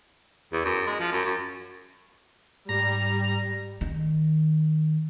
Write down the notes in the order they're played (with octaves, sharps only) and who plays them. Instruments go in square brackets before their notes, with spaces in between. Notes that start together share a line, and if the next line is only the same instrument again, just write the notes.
[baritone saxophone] E2
F#2
G#3
F3
F#2
F#2
[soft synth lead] G#2 [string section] G3 [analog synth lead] A#5
[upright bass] D#3